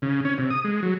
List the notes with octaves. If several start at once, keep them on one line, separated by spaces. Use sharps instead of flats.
C#3
C#4
C3
D#6
G#3
F#3